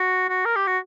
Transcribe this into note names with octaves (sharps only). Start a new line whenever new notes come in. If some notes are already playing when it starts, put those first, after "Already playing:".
Already playing: F#4
F#4
A#4
G4
F#4